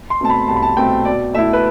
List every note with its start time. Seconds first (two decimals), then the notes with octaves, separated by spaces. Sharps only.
0.10 C6
0.20 B2 A3 C4 A5
0.30 B5
0.48 C2 A5
0.56 B5
0.62 A5
0.77 B2 A3 C4 G5
1.05 B2 D5
1.34 A3 E5
1.38 E4
1.53 B4